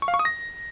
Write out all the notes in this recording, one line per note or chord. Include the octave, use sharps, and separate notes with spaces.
C#6
F5
C#6
D#6
A#6